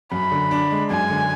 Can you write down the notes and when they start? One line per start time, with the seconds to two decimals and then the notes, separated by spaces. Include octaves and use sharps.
0.12 F#2 B5
0.32 D3
0.51 D4
0.71 G#3
0.90 F#2 G#5
1.10 D3